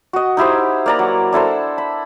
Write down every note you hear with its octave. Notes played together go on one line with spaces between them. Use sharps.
F#4 D#5
D#4 E4 G4 C5
A#3 D5 A#5
F#3
D4 E4 A4 C5
B5